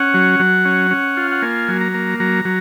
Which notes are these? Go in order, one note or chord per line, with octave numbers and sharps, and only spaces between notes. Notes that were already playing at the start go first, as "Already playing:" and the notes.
Already playing: C#4 F#5
F#3
F#3
C#4
C#4
F4
F#5
A#3 G#5
F#3
A#5
A#3
F#3 A#5
F#3